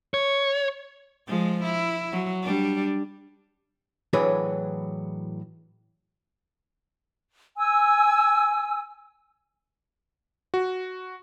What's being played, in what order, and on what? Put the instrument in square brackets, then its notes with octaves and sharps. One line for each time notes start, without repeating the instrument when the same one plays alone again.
[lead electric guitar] C#5
[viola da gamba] F3 G#3
E4
F#3
G3 D4
[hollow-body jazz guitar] A2 E3 F#3 D4 G#4 B4
[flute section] G#5 E6
[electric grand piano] F#4